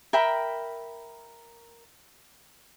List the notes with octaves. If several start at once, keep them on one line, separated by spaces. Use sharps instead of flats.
A#4 E5 G5 B5